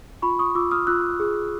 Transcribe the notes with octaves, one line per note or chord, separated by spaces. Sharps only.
F4 B5 C#6
C#6 D#6
F4 D6 E6
D#6 F6
F4 E6 F#6
G#4